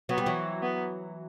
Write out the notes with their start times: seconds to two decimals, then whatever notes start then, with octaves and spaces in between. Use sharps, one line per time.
0.09 F#3 B3
0.18 G3
0.26 E3 F#3
0.63 B3